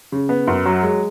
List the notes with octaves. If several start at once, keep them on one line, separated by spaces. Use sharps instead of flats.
C#3
B3
F#2
F#3
G#3